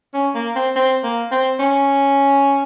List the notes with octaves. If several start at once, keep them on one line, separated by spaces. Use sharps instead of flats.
C#4
A#3
C4
C4
A#3
C4
C#4